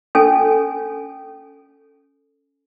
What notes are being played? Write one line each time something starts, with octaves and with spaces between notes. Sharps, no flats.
C#4 A4 G#5